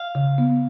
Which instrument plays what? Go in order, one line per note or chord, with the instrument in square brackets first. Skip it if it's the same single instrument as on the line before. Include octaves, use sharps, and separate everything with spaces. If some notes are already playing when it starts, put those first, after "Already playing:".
Already playing: [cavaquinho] F5
[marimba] C#3
B3